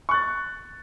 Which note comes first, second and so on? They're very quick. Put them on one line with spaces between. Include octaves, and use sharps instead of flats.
C#6 F#6 A6